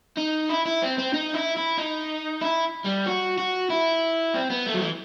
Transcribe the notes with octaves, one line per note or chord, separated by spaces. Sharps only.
D#4
E4
E4
C4
C4
D#4
E4
E4
D#4
E4
G3
F#4
F#4
E4
C4
B3
A3
F#3
E3